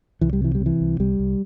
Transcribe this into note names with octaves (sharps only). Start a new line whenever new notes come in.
C2 E3
G3
C3 E3
G3
C3
E3
C2
C2 G3
C2